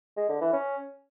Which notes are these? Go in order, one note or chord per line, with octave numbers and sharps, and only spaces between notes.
G#3
D3
E3
C#4